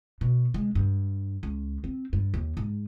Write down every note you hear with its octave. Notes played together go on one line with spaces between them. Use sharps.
B2
G#3
G2
C#2
C4
G2
D#2
G#2